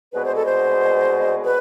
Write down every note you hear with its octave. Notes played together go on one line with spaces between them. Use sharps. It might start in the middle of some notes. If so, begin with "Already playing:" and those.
C2 B2 G#3 B3 B4
C5
A4
C5
B4